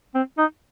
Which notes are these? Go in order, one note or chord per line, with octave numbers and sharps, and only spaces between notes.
C4
D#4